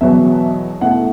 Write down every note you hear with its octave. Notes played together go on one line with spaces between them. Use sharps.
E2 B2 F#3 B3 E5
B2 A3 E4 F#5